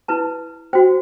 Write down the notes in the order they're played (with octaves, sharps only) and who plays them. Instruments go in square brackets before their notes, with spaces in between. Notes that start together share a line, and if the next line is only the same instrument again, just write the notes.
[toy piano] E4 B4 A5
F#4 C5 G5